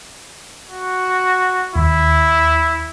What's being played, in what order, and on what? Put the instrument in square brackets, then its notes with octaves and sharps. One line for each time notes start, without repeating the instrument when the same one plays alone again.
[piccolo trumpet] F#4
[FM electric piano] D#2 [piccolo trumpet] E4